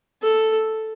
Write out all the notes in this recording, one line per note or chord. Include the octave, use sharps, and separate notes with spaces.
A4